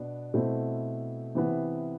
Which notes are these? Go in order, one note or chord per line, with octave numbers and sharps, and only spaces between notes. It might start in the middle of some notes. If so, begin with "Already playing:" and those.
Already playing: B2 B3 D4
B2 A3 C4 E4
C3 E3 B3 E4